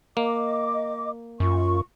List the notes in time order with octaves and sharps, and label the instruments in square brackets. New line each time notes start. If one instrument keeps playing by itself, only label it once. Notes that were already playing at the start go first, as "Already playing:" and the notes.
[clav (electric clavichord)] A#3 [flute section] D#5 D6
[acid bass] F#2 [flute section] F4 C#6